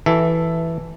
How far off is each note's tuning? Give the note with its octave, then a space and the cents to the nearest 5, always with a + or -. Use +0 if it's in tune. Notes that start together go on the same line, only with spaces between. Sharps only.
E3 +0 F#4 +45 A4 +0